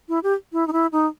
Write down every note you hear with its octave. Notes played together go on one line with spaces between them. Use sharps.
E4
G4
E4
D#4
E4
D#4